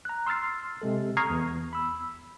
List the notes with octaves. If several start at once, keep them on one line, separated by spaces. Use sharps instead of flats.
A#5 F#6
C6 E6 F6 A6 C7
C3 G#3 A4
A#5 C#6 D#6 F6 G#6 C7
E2
B5 E6